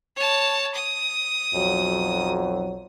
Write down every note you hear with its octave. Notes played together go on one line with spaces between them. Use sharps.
C#5 A5
D#6
B1 F2 F#3